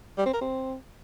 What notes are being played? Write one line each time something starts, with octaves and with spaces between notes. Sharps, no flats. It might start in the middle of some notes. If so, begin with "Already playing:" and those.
G3
C4
A#4
C4